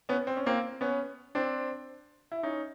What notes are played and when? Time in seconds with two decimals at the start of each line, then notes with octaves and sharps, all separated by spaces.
0.09 B3 C#4
0.27 C4
0.37 C#4
0.46 A#3 C4
0.81 B3 C#4
1.35 C4 D4
2.32 E4
2.43 C#4 D#4